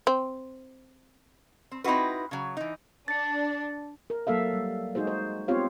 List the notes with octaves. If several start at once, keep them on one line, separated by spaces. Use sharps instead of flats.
C4
C4
C4 D#4 E4 F#4 B4
C#3 F#3
E3 D#4
D4 A6 C#7
A#4
F#3 A#3 A4 E5 F5
G3
G#3 D#4 F#4 G#4 C5
C5
B3 C4 F4 G4 C#5 F5